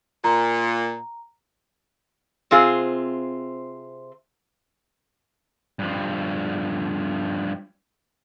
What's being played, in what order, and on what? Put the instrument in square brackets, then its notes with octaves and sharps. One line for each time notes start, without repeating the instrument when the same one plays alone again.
[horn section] A#2 [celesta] A#5
[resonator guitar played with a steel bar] C3 C4 F4 G#4
[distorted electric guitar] G2 F3